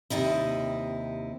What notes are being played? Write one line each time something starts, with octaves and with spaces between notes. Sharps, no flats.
D#2 A2 C3 D#4 E4